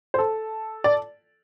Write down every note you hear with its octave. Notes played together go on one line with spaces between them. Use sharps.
C5
A4
D5